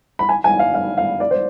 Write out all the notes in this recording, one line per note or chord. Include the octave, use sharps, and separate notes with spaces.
B5
G#5
G#5
F5
F5
F5
D5
C5